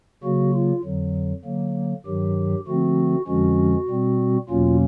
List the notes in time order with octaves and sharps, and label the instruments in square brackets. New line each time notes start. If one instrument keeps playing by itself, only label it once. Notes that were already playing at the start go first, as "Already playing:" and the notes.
[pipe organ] C#3 F#3 A#3 F#4
F4
F2 D3 F#3
D3 F#3 A#3
G2 D#3 F#3 G4
D3 F3 A3 C4 F#4
F2 D3 F3 G#3 C#4 F#4
B2 G3 C4
E2 B2 F#3 A#3 C#4 F4